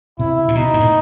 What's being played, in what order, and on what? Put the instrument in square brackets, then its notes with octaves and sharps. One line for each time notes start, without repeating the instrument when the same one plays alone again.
[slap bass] C3 [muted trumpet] E4
[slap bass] A#2
[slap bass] B2 [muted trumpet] D#4
[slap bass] G#2
A2